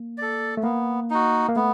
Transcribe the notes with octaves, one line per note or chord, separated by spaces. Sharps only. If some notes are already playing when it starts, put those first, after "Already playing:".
Already playing: A#3
A4 D5
A3
A#3 B3
D#4 F#4
A#3
A3 B3